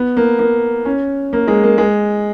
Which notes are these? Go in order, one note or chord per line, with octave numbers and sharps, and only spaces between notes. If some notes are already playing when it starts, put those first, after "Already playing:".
Already playing: B3
A#3
A#3
C#4
A#3
G#3
A#3
G#3